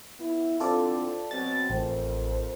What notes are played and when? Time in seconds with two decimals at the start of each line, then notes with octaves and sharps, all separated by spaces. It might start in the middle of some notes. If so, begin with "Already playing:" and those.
0.19 B3 E4
0.60 D3 E3 C4 F4 A4 D5
1.31 B2 F#3 C4 A6
1.70 A1 F2 A#4 C5